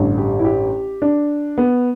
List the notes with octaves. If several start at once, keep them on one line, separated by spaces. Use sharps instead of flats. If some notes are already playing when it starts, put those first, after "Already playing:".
Already playing: A1 G2 D3
G4
E4
G4
D4
B3